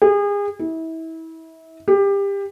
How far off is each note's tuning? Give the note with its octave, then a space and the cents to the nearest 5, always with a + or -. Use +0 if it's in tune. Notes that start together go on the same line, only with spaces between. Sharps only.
G#4 -35
E4 -30
G4 +25